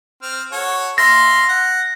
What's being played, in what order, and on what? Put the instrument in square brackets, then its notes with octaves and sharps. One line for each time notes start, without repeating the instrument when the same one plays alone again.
[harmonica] C4 F6
F#4 A4 C#5
[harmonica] E5 F5 C6 [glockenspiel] A#6
[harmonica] F#5